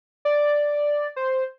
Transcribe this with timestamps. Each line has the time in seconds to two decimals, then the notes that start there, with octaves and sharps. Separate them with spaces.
0.25 D5
1.16 C5